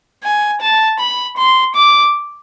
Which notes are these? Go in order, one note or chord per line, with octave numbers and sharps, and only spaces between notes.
G#5
A5
B5
C6
D6